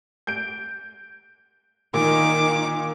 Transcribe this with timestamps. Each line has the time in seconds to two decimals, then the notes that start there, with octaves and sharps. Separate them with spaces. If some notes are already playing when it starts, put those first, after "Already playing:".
0.27 G6 D7
1.94 A#2 D#3 D6